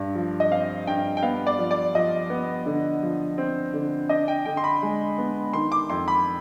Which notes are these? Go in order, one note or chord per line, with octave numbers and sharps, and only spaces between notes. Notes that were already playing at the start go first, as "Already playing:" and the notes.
Already playing: G2
F3
D#5
C4 F5
G2 G5
G5
B3 F5
D5
F3
D5
F3 D#5
B3
D3
F3
C4
D3
D4 D#5
G5
D3 G5
C6
B5
G#3
B3
D#3 C6
D6
F2 C6
B5